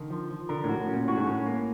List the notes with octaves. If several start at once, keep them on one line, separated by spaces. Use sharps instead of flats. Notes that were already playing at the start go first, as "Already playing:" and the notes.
Already playing: D3 D#3
F3
F3
D3 A#4
A2
F#4
A2
C#4
A#2
A2 F#4
G#2
A2 C#4
A#3